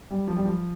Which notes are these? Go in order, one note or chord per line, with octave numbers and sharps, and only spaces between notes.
G3
F3
G3
F3